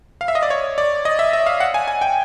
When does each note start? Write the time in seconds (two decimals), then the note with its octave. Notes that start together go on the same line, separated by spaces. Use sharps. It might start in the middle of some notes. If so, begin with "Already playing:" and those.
0.21 F5
0.28 E5
0.35 D#5
0.43 D5
0.50 C#5
0.78 D5
1.05 D#5
1.19 E5
1.33 E5
1.47 F5
1.60 F#5
1.74 G#5
1.88 G#5
2.01 G5